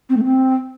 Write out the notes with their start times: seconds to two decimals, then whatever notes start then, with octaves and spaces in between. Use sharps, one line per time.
0.09 C4
0.17 A3
0.24 C4